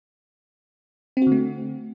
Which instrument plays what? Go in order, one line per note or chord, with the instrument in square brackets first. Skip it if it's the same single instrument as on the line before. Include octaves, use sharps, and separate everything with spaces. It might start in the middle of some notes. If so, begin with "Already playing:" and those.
[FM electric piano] C4
F#4
D3
A3